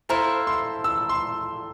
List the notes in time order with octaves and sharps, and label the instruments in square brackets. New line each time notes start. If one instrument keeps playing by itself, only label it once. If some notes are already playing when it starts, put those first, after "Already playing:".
[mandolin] E4 A4 C5 F5 [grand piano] A#5
[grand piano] C6
E6
C6